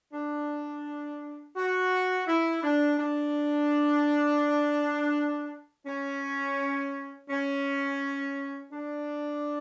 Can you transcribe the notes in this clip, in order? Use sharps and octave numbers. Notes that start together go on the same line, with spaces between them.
D4
F#4
E4
D4
D4
C#4
C#4
D4